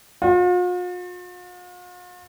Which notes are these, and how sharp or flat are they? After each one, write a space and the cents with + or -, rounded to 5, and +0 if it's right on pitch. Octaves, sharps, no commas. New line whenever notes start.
F4 +45